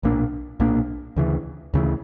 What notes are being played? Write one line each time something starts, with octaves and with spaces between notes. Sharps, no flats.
B1 A#2 A#3 D4
B1 A#2 A#3 D4
D2 C#3 E3
D2 C#3 E3